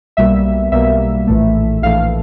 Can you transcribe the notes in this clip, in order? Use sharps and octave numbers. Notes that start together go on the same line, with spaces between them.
B1 B2 G3 A#3 E5
B1 B2 G3 A#3 E5
A#1 A2 E3 A3
A#1 A2 E3 A3 F5